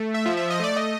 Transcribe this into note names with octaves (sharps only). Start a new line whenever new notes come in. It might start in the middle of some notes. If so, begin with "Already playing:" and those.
Already playing: A3
E5
F3
E5
D#5
A3 D5
D#5